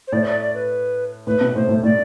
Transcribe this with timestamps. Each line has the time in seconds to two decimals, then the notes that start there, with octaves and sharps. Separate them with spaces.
0.07 C5
0.12 A2 D5
0.23 C5
0.27 D5
0.41 D5
0.55 B4
1.27 A2 B4
1.41 B2
1.55 A2 C5
1.69 A2
1.83 A2 D5